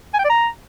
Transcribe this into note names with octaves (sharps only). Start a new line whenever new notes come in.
G#5
G5
D5
A#5